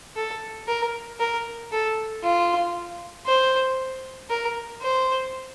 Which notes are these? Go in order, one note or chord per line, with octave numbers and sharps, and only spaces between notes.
A4
A#4
A#4
A4
F4
C5
A#4
C5